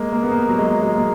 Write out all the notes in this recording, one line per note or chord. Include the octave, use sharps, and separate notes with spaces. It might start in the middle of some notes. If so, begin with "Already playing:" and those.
Already playing: G#3 A#3
A#3
B3
A#3
F#3
G#3
G#3
A#3